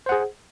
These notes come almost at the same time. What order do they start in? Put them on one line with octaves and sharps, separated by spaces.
C5 F#5 G#4